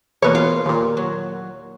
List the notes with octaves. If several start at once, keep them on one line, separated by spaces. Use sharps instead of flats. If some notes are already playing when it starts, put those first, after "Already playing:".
E2 B2 A#3 B4 C#5
F4
D#2 A#2
F#3